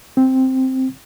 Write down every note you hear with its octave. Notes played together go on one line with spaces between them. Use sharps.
C4